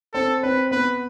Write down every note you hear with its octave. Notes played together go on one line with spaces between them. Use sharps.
C4 A4
C4 B4
B3 B4